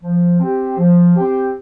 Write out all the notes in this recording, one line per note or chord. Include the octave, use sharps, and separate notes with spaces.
F3
C4 G4
F3
G4
C4